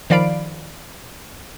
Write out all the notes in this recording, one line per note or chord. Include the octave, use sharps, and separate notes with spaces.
D#3 F3 D5 F5 B5 D7